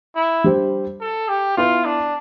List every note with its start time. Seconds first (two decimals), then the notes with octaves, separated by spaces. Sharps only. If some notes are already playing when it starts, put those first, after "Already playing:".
0.16 E4
0.44 G3 D4 G4 C5
1.01 A4
1.28 G4
1.57 B3 E4 F4 B4 E5
1.85 D4